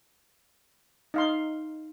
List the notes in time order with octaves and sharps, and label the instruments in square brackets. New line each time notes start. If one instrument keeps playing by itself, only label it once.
[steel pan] D#4 F5 C6